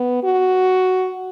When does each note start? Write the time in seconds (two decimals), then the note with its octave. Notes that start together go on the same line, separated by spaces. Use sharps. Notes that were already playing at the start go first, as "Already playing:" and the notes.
Already playing: B3
0.23 F#4